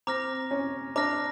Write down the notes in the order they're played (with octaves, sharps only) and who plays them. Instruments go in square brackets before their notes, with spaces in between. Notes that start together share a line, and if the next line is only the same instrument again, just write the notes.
[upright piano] C4 [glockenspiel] A#5 D6 F6 A#6
[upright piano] C#4
[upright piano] D4 [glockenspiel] A#5 D6 F6 A#6